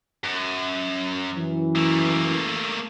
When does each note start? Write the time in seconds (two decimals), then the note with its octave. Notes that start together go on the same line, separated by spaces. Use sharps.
0.24 F#2
1.36 F#2 E3
1.76 A3 A#3